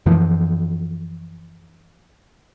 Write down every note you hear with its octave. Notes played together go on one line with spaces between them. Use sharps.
F#2 E3 F3